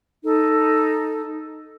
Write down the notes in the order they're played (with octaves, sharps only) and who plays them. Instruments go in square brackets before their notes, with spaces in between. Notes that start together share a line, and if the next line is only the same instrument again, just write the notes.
[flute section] D#4 A4